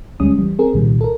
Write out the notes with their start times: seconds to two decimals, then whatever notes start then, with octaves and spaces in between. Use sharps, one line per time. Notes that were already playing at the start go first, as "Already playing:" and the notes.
0.20 D2 G3 G#3 C#4 D#6
0.39 E3 G3
0.59 C4 G#4 A#4
0.74 C2 A#2 D#3 G3
1.01 A4 A#4